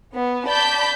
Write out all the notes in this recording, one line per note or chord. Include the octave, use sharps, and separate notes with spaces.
B3
D5 A5 B5 G6 B6